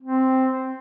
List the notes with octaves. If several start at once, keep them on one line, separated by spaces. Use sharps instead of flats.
C4